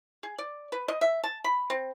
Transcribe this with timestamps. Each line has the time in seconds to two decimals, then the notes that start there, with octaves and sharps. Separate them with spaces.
0.23 G#4
0.38 D5
0.72 B4
0.88 D#5
1.01 E5
1.23 A5
1.44 B5
1.70 C4